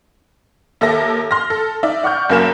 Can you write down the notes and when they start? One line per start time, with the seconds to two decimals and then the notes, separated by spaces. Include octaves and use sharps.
0.81 D#2 A4 A#4 E5 A#6
1.31 C6 F6 A#6
1.50 A4
1.83 D#4 D5 E5
2.03 D5 F#5 C#6 F6 G6
2.29 F#1 F#3 A#3 A#4 G#5 E7